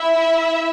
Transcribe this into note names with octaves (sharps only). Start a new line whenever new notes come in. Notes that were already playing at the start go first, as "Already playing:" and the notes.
Already playing: E4 E5